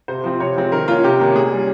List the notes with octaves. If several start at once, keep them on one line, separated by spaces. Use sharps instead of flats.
C3 C5
F3 C4
C3 C#5
F3 G#3 C4
D#3 A#4
A#3 C#4 F4
C3 G4
D#3 A#3 C#4
A#2 G#4
G3 C#4